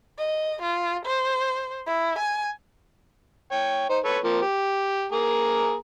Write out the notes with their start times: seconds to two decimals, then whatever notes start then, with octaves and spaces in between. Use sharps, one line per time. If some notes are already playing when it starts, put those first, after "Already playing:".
0.18 D#5
0.62 F4
1.05 C5
1.86 E4
2.18 G#5
3.51 C#5 G5
3.89 D#4 C5
4.04 A4 B4 C#5
4.24 F3 A#3 C4
4.42 G4
5.12 A#3 G#4 A#5